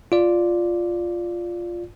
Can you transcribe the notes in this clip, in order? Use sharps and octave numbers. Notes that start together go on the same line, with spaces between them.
F4 D5